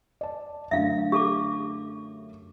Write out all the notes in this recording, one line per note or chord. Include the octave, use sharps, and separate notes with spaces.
D5 A5
F#2 D3 A3 E5 F5
G4 A4 D6